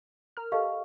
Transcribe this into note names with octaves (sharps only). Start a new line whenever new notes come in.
A#4 F6
G4 A4 D#5 F5 C#6